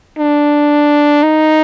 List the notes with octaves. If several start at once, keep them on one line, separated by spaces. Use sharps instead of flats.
D4
D#4